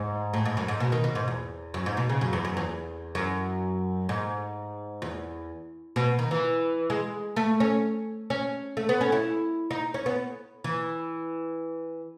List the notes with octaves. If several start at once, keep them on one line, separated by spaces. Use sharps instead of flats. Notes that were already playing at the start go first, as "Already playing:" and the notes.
Already playing: G#2
A2
G#2
F#2
G#2
B2
D#3
B2
G#2
E2
F#2
G#2
B2
C#3
F#2
E2
F#2
E2
F#2
G#2
E2
B2
D#3
E3
G#3
A3
C#4
C#4
A3
B3
C#4
E4
D#4
C#4
B3
E3